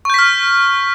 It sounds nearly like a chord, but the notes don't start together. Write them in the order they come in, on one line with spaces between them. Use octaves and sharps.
C#6 G6 B6 F6